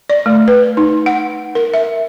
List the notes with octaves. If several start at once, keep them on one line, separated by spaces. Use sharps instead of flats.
D5
A3
B4
D#4
F#5
A#4
E5